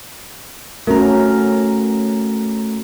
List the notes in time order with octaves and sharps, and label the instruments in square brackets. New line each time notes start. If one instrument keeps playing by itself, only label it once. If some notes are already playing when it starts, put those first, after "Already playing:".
[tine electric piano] A3 A#5 [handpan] C#4 F#4 A#4